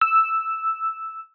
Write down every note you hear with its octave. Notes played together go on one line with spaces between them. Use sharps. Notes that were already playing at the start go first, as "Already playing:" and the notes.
E6